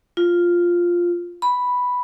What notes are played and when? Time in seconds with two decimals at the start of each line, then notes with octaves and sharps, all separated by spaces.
0.17 F4
1.42 B5